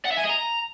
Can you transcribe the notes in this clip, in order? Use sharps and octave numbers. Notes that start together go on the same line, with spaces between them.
F#5
E5
G#5
D#5
A#5